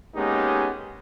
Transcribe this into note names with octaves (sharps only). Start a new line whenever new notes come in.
G#3 A#3 B3 C#4 D#4 G4